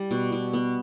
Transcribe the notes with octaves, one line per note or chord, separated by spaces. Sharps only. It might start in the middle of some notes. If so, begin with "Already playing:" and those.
Already playing: G3
B2
B2
B3